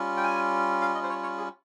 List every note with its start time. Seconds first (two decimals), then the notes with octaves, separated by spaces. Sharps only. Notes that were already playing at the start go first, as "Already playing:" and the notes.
Already playing: G3 C#4 F4
0.17 G5
0.23 G#5
0.81 F5
0.95 D#5
1.03 C5
1.09 C#5
1.23 C#5
1.37 G#4